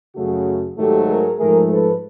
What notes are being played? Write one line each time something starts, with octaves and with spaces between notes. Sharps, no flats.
F#2 C#3 F#3 A3 F#4 G#4
G#2 D#3 F#3 A3 G4 A4
G#4 A#4
G#2 F3 A3 G#4 A#4
A4 B4